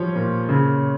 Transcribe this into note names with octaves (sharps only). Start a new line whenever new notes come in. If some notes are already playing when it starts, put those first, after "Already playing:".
Already playing: F3 G3 C#5
A#2
C#3